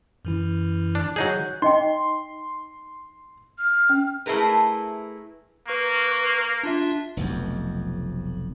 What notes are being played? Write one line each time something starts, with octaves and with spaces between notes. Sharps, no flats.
F#2 E3 E4
D4
F#3 D#4 G#4 F#6 G6
D#4 D#5 G5 C6
F6
C#4
A3 E4 G#4 A#4 B4
A#3 B4 C#6
D4 F4 E5
F1 B1 F2